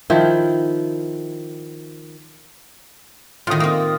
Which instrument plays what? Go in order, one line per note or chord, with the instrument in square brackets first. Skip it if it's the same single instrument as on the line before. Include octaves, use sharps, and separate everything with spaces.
[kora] D#3 F3 E4
[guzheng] A2 D#3 [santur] F4 D#6
[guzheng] A#3 C4 [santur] D#5